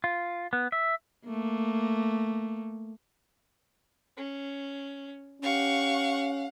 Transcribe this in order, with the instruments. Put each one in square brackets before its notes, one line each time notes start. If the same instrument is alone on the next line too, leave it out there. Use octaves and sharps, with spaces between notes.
[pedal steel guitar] F4
B3
E5
[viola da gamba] A3 A#3
[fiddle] C#4
[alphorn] C#4 [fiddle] G4 C#6 [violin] F5 F#5